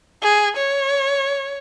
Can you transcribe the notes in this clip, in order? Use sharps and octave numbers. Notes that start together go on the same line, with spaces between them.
G#4
C#5